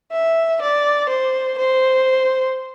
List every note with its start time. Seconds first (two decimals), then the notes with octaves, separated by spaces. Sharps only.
0.12 E5
0.62 D5
1.09 C5
1.58 C5